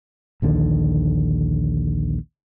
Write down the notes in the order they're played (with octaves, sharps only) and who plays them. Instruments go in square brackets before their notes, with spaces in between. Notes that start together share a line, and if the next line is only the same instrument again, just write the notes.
[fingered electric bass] A#1 D#2 D3 D#3